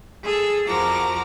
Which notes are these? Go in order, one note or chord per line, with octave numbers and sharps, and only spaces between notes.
G#4 A4 E6
F2 F3 F#4 A#4 A#5 D6